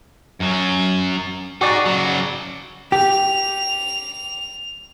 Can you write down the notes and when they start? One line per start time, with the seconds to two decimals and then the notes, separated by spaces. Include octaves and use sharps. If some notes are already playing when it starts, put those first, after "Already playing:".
0.40 F#2 F#3
1.61 D#4 F#4 G#4 D5
1.86 C#3 F#3
2.92 G4 F7